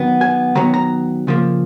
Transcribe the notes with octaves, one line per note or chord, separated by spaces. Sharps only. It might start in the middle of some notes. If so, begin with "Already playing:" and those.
Already playing: D#3 F#3 B3
G#5
D#3 F#3 B3 A#5
A#5
C#3 F3 A#3